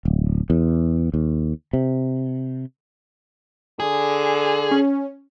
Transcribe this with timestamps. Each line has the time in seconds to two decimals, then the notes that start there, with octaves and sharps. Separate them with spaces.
0.05 D1
0.50 E2
1.14 D#2
1.73 C3
3.80 D3 G#4
4.71 C#4